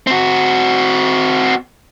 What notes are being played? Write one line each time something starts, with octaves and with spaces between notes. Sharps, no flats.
C4 F#4